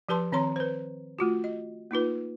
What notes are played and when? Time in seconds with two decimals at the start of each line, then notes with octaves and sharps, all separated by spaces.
0.09 F3 G4 B4 A5 C6
0.32 D#3 C4 C#5 A#5 C6
0.56 B4 C5
1.19 A3 F4 F#4
1.44 D#5
1.91 A#3 D#4 F4 B4